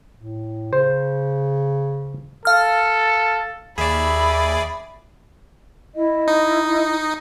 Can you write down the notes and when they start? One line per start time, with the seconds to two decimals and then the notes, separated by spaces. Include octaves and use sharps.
0.20 A2
0.73 C#3 C5
2.45 A4 F5 F6
3.78 D#2 G#4 D5 E5 B5
5.95 E4 D#5
6.28 D#4